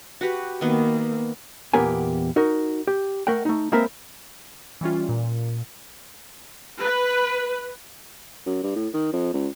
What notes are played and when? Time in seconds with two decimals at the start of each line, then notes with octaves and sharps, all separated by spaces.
0.21 F#4 G4 B4
0.61 D#3 A#3 B3
1.73 E2 A#2 B3 G4 A#4 G#5
2.36 D#4 F#4 A#4
2.87 G4
3.27 A3 A#4 F#5 G5
3.45 A3 D#4
3.72 G#3 A#3 C4 A#4 B4 E5
4.81 E3 G3 C#4 F4
5.09 A#2
6.81 B4
8.46 F#2
8.63 G2
8.76 A2
8.93 D#3
9.13 F2
9.33 C#2